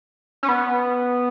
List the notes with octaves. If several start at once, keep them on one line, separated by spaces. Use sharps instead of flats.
C#4
B3